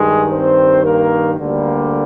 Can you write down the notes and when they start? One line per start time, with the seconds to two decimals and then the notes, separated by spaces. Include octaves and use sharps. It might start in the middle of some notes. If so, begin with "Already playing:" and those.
Already playing: G2 D#3 G#3 G#4
0.32 C4 C5
0.84 A#3 A#4
1.38 D2 D3 G3 A#3